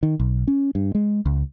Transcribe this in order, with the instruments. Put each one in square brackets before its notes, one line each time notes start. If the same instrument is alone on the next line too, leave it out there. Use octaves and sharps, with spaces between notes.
[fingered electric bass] D#3
B1
C#4
G2
G#3
C#2